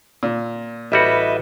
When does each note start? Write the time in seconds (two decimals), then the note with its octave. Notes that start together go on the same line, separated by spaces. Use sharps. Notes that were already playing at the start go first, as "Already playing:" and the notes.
0.23 A#2
0.92 A1 G3 F#4 B4 D#5 E5